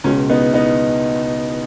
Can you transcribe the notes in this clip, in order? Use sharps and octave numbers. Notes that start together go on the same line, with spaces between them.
C#2 B2 G#3 C#4
B3 D#4
B3 D#4